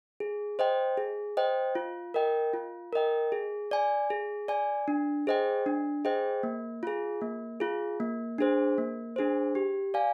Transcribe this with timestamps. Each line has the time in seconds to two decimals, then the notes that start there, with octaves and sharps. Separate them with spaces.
0.20 G#4
0.59 C5 D#5 G5
0.97 G#4
1.37 C5 D#5 G5
1.75 F4
2.14 A#4 D#5 G5
2.54 F4
2.93 A#4 D#5 G5
3.32 G#4
3.71 D5 G#5
4.10 G#4
4.48 D5 G#5
4.88 D4
5.27 G#4 C5 D#5 G5
5.66 D4
6.05 G#4 C5 D#5 G5
6.43 A#3
6.83 F4 G#4
7.21 A#3
7.60 F4 G#4
8.00 A#3
8.38 D4 G#4 C5
8.78 A#3
9.16 D4 G#4 C5
9.55 G4
9.94 D5 F5 G#5